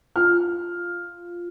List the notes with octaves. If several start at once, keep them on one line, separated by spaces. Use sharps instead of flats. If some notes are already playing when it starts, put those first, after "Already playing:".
F4 F6